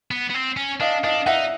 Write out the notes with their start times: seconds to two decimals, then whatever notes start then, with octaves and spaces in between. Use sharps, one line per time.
0.11 B3
0.30 B3
0.34 C4
0.57 C#4
0.80 D4 D#5 F5
1.04 D4 D#5 F5
1.26 D#4 E5 F#5